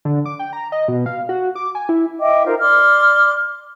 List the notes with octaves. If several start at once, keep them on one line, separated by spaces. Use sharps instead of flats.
D3
D6
G5
A#5
D#5
B2
F5
F#4
D6
G#5
E4
D#5 E5 G5 D6
D#4 F4 A#4 C5
D5 C6 D6 F6